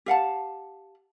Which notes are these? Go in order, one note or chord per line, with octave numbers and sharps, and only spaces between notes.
G4 F5 F#5 A5